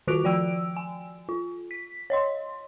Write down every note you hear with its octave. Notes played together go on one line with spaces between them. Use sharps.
D#3 F4 F#4 F#6 D7 F7
F3 D5 G5 E6 D7
G#5
F4
B6
C#5 D#5 C6